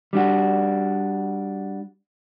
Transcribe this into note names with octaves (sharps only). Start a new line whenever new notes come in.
G3 D4 F#4